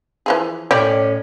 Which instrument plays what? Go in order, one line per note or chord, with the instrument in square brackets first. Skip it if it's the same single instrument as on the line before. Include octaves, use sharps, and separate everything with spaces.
[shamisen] E3 F3 G#4
[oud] A2 C#4 D5 [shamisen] G4